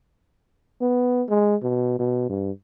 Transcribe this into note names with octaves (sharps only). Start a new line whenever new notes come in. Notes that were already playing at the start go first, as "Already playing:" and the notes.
B3
G#3
B2
B2
G2